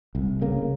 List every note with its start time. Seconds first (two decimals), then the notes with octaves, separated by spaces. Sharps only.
0.15 C2
0.41 C#3 A#3